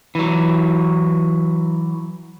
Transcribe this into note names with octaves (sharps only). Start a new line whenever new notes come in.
E3 F#3